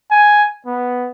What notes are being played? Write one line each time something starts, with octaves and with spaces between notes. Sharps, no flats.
G#5
B3